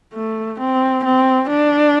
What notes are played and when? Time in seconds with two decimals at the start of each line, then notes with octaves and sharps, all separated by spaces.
0.14 A3
0.60 C4
1.05 C4
1.50 D4